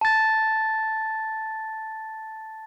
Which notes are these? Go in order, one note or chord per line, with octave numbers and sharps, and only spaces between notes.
A5 A6